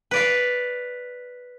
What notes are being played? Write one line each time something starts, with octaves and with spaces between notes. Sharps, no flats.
B4 D5 F5